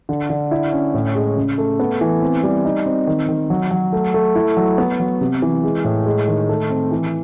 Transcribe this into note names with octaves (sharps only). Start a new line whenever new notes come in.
D3
D3
E4
C#4
A2
G#3
C#3
A3
B3
E3
C4
G3
D#4
C4
D#3
D#3
F#3
F#3
A3
A3
E4
F#3
B3
F#3
C3
E3
G#3
A2
G#3
D#3
A3
C4
E3